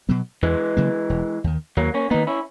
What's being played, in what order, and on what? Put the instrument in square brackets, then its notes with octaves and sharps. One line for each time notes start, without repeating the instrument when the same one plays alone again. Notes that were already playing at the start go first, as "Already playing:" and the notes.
[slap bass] B2 F#3 B3
[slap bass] E2 [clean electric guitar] E3 G#3
[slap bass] C#3 F#3 A#3
E1
D#2 D#3
[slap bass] D#2 [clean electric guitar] F#3 A#3
[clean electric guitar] A#3 C#4
[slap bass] D#3 A#3 [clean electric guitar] B3 D#4
[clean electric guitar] C#4 E4